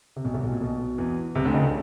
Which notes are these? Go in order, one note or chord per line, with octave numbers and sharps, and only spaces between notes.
C3
B1 B2
C2 C3
B1 B2
A#2
B1 B2
E2 E3
C2 C3
D2 D3
C#2 C#3
D3